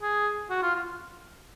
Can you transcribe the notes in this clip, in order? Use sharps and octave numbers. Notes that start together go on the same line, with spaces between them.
G#4
F#4
F4
F4